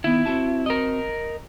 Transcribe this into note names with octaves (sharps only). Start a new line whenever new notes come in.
D#3 B3 E4
C4 F#4 A5
A#4 D#5